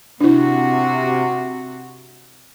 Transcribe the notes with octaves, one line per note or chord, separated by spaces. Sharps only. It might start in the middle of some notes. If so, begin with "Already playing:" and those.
C3 D4 E4 F#4